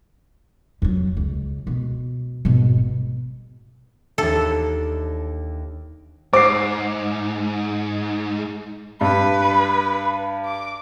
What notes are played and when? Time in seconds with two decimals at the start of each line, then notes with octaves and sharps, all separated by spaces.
0.82 F2 F#3
1.17 C#2
1.67 B2
2.45 G#1 B2
4.18 D#2 D4 A4 E5
6.34 G#2 C5 D6 C7
9.01 G2 B4
10.45 D6